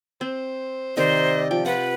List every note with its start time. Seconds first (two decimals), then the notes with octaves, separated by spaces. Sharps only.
0.21 C4 C5
0.97 C3 D#3 A#4 C5 D5 D#5
1.51 F3 G5
1.66 F4 B4 F#5